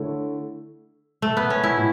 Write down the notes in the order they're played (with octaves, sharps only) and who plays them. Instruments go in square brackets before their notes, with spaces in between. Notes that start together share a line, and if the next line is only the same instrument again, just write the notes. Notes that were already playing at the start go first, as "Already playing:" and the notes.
Already playing: [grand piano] D3 A3 E4 A4 C#5
[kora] A3
B3
C#4
E4
[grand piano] A2